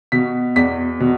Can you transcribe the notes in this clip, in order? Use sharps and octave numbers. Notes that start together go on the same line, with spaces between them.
B2 B6
E2 B6
B2